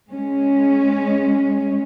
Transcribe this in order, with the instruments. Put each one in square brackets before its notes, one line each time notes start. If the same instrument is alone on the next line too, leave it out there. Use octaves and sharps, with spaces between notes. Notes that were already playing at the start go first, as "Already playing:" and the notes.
[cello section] G#3 C#4